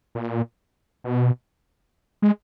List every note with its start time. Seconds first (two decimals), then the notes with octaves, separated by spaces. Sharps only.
0.15 A#2
1.04 B2
2.22 G#3